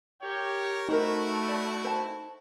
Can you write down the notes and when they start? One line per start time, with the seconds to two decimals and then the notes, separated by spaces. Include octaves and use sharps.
0.22 G4 A#4 C#5
0.89 A3 D#4 E4 F#4 A#4 C5 A#5
1.48 C#5 D5
1.84 C5 A5